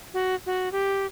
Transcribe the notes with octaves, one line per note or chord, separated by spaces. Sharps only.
F#4
F#4
G4